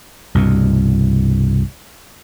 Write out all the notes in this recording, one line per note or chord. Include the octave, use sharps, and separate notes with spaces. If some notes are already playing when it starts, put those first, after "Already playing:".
C2 G2 B2